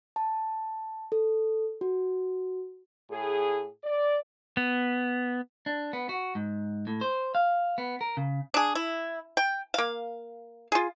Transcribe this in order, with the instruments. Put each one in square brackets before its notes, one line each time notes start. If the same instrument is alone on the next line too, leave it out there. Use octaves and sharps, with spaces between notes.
[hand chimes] A5
A4
F#4
[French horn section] A2 G#4
D5
[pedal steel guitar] B3
[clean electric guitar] D4
B3
F#4
G#2
A2
C5
F5
B3
A#4
C#3
[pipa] D4 G#4
E4
G5
A#3 F5
F4 G#4